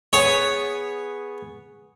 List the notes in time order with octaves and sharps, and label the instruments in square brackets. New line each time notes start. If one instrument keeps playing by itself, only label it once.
[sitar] B3 G#4 [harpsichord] C#5